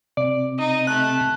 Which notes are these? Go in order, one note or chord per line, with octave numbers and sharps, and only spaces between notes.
C3 D5
D#4 D#5
A3 F#6